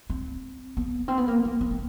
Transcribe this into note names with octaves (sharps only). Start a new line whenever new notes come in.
C4
B3
C4
B3
A#3
A3
B3
A3